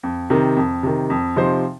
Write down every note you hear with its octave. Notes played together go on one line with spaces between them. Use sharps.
F2
C3 D#3
F2
C3 D#3
F2
C3 F3 D#4 C5